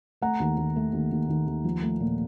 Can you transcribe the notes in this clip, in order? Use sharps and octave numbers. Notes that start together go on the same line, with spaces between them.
A3 F#5 A#5
D#2
D#2
A3
D#2
D#2
D#2
D#2
F3
A3
A#2